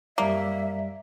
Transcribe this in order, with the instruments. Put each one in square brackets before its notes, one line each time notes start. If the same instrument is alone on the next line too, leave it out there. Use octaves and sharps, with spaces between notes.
[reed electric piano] F#2 G3 D5 [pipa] A#3 [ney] E5